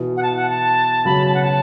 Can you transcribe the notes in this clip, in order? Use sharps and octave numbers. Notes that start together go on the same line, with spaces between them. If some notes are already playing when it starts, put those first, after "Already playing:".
Already playing: B2 E3
F#5
A5
F#5
A5
C#3 F#3 B5
A5
F#5
A5